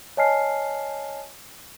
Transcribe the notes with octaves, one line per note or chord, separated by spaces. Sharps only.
C#5 D#5 G#5 A5 F6 C7